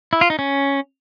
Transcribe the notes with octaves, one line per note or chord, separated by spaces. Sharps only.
E4
F4
D#4
C#4